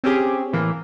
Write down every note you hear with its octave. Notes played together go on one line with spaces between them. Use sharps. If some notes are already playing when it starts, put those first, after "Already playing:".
C4 C#4 G4 G#4
A2 E3 A#3